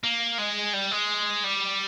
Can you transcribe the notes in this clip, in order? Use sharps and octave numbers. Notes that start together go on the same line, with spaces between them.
A#3
G#3
G3
G#3
G3